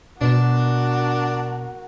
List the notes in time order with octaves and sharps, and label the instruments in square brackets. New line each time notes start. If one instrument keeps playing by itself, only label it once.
[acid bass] B2 [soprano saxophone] D4 [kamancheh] F#4 A#4